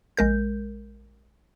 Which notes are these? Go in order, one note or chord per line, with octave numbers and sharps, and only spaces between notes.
A#1 G#3 A#4 G6